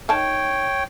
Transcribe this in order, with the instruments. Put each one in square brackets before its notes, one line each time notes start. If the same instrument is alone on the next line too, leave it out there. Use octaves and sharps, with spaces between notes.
[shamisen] D#3 A5 [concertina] C#5 G5